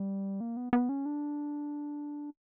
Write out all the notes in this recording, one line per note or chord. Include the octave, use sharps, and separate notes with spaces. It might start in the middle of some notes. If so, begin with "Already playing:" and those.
Already playing: G3
A#3
B3
B3
C#4
D4